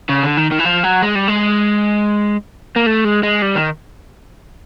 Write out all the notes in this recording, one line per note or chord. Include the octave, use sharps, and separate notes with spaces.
C#3
D3
D#3
D#3
E3
F3
F#3
G#3
G3
G#3
A#3
A3
G#3
G#3
G3
D#3